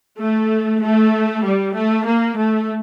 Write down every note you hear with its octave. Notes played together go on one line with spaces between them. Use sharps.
A3
A3
G3
A3
A#3
A3